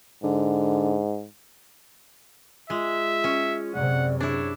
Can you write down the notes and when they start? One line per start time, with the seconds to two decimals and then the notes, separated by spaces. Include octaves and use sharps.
0.24 G#2 D3
2.70 G#3 F4 E5
3.24 C#4
3.75 F#2 C3 D5 F#5
4.20 D4 E4 G#4 C#5